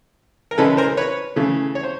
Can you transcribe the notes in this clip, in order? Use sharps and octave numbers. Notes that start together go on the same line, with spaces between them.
A#4
C#3 E3 G#3 C#4 A4 B4
A#4 C5
B4 C#5
C#3 E3 A3
C#5
C5